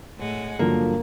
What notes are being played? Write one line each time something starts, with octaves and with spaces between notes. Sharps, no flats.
A2 G#3 F#5
G2 D3 F3 F#3 A#3